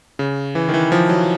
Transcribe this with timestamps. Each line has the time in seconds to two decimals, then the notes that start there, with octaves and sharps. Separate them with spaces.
0.19 C#3
0.55 E3
0.69 D#3
0.74 E3
0.92 F3
1.09 F#3